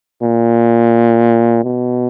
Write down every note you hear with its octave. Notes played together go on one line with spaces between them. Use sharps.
A#2
B2